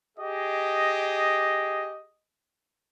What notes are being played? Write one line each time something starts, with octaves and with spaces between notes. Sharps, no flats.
G4 G#4 D#5